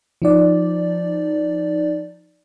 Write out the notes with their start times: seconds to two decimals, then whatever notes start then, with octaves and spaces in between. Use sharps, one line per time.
0.22 F3 D#4 D5